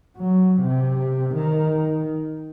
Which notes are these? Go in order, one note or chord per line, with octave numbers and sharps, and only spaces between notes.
F#3
C3
D#3